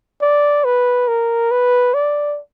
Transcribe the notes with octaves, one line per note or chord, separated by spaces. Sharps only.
D5
B4
A#4
B4
D5